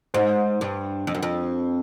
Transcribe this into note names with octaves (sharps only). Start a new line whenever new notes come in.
G#2 C5
G2
F2
F#2
F2